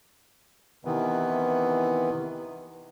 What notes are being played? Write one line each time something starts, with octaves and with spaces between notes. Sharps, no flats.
C3 D#3 E3 B3